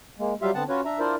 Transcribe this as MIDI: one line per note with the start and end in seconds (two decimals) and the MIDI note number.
0.19 0.34 56
0.19 0.34 58
0.42 0.51 54
0.42 0.51 55
0.42 0.51 65
0.42 0.51 67
0.42 0.51 76
0.42 0.51 77
0.54 0.64 50
0.54 0.64 59
0.54 0.64 60
0.54 0.64 78
0.54 0.64 81
0.69 0.81 61
0.69 0.81 65
0.69 0.81 66
0.69 0.81 71
0.69 0.81 73
0.85 0.99 62
0.85 0.99 76
0.85 0.99 82
0.99 1.15 62
0.99 1.15 64
0.99 1.15 65
0.99 1.15 70
0.99 1.15 72
0.99 1.15 74